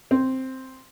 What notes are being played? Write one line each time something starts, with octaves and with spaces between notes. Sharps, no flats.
C4